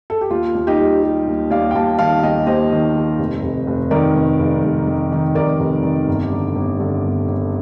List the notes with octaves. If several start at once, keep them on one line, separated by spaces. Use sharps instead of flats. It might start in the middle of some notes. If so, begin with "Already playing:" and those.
A4
G4
D#2 F4
D#2
D#4 G4
G3
G3
D#2
D#2 D5 F5
G5
D#2 F5 A5
D#3 F5 A5
D#2 D#5 G5
D#2 C5 D#5
D#3
D#2
F1
F1
F1
D#3 A#4 D5
F1
F1
F1
D#3
D#3
F1 A#4 D5
F1
D#3
G1
D3
G1
D3
G1
G1